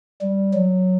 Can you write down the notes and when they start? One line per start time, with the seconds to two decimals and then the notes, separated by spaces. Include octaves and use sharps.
0.21 G3
0.53 F#3